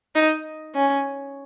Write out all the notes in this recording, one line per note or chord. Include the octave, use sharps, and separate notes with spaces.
D#4
C#4